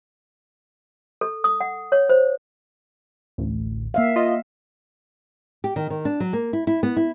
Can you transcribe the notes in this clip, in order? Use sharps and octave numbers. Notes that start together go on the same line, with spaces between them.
A4
D#6
F#5
C#5
C5
A1 D2
A#3 E5 F5
F4 D#5
G4
D#3
D#3
D4
F#3
A#3
E4
E4
B3
E4